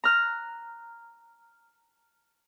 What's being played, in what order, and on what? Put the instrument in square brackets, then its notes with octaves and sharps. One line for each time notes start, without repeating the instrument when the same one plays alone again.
[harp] A#5 F6 F#6